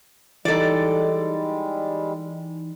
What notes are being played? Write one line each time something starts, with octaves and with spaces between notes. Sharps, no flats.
E3 G3 G#3 D#4 A4 D5